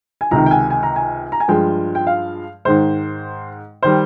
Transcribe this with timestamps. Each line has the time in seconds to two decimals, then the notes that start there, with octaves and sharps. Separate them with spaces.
0.21 G#5
0.31 C#2 C3 D#3 A#5
0.46 G5
0.51 G#5
0.70 G#5
0.83 A#5
0.96 G#5
1.32 A#5
1.40 G#5
1.48 G2 F3 G#3 G5
1.95 G5
2.07 F5
2.65 G#2 D#3 G#3 C5
3.83 D#3 G3 C5